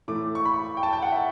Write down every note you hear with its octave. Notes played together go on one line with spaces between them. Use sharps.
A2 E3 A3 D6
C#6
B5
G5
A5
G5
F#5
E5